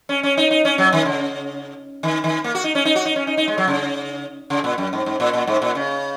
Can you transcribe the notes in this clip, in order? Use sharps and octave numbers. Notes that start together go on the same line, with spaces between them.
C#4
C#4
D#4
D#4
C#4
F#3
D#3
C#3
D#3
D#3
A#3
F#4
D#4
C#4
D#4
F#4
D#4
C#4
D#4
D#4
G#3
F#3
C#3
C#3
A#2
F#2
G#2
G#2
A#2
A#2
G#2
A#2
C#3